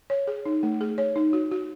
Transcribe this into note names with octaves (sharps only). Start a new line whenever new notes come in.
C#5
G#4
D#4
A3
G#4
C#5
D#4
F#4
F#4